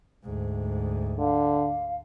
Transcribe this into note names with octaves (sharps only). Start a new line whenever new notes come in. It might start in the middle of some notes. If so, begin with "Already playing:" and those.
D2 G#2
D3 F5